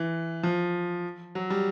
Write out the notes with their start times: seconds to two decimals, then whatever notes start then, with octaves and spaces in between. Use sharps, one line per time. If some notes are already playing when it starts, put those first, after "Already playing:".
Already playing: E3
0.43 F3
1.35 F#3
1.50 G3